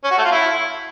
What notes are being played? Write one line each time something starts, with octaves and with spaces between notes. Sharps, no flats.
C#4
F#4
A3
F4
E4